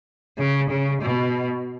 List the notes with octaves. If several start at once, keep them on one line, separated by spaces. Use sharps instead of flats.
C#3
C#3
B2